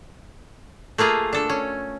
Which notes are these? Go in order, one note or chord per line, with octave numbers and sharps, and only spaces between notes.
A3 A#3 F4 G#4
D4 A4
C#4